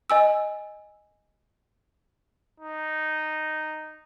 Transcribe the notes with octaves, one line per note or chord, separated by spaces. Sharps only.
D#5 G#5 E6
D#4